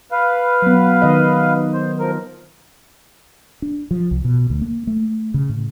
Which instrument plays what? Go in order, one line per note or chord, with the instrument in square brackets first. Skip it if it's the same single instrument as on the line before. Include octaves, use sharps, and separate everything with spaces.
[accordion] B4 F5
[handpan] F#3 B3
D#3 D#5
[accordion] C5
F3 A#4
[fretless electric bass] D4
F3
C2
B2
D2
A#3
A3
C#3
A2